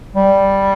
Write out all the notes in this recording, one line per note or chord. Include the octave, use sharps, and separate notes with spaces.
G3